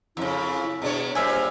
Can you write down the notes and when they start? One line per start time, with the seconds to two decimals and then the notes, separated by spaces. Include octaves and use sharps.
0.17 F2 C#3 E4 E5
0.82 B2 D4 G#4 C#5
1.15 A#2 G3 G#4 C5 E5 F5